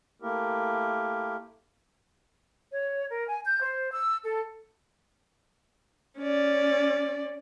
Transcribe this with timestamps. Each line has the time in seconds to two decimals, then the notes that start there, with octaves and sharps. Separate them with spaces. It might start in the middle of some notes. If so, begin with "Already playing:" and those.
0.22 A3 A#3 E4 G4 A#4
2.73 C#5
3.10 A#4
3.29 G#5
3.46 G6
3.62 C5
3.91 E6
4.24 A4
6.18 C#4 D5